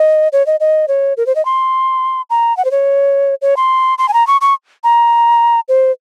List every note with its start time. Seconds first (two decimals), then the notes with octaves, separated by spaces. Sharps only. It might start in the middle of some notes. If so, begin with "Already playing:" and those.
Already playing: D#5
0.33 C#5
0.46 D#5
0.60 D#5
0.88 C#5
1.17 A#4
1.27 C5
1.36 D#5
1.45 C6
2.30 A#5
2.57 F#5
2.65 C5
2.71 C#5
3.42 C#5
3.57 C6
3.98 C6
4.09 G#5
4.13 A#5
4.27 C#6
4.41 C#6
4.84 A#5
5.69 C5